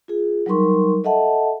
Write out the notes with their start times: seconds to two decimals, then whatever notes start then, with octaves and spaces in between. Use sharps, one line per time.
0.08 F4 G#4
0.46 F#3 G3 D#4 A#4 C6 C#6
1.04 A4 D#5 E5 F#5 A5